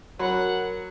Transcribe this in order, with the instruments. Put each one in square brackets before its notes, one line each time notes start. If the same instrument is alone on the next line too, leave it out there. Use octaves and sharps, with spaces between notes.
[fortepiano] F#3 [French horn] A#4 [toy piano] C#5 B5 C6 [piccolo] F#5